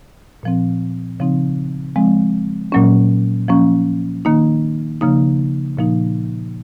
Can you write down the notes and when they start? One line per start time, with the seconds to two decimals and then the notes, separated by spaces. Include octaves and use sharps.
0.43 A#2 F3 C4
1.20 C#3 F3 C4 D#4
1.96 F3 G#3 C4
2.72 A#2 F#3 A#3 C#4
3.48 F3 A#3 C#4
4.25 D#3 A#3 D#4
5.01 C#3 F3 A#3 D#4
5.77 A#2 F3 A#3 D#4